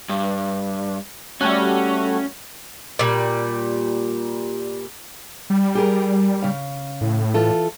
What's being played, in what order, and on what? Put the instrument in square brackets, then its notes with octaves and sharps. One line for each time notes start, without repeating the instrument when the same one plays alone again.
[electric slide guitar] G2
[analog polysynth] G3 A3 F#4 [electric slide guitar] C#4
[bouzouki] A#2 G3
[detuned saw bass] G3
[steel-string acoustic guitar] G4 G#4 A#4
C#3 F5
[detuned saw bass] A2
[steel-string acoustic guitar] E3 F4 A4